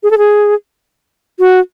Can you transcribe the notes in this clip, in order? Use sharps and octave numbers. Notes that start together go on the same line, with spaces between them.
G#4
A4
G#4
F#4